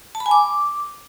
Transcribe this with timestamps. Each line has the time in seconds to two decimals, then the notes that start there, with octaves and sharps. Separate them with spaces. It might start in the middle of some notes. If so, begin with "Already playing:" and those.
0.15 A5
0.20 B5
0.26 G#5
0.31 D6